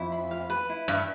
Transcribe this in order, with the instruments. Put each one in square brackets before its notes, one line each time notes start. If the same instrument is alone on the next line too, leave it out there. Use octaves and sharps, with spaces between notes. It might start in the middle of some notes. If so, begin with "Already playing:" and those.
Already playing: [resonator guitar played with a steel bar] F2 [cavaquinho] E4
[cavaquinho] B5
F5
B4
E4
[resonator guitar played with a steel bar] G2 [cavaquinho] E5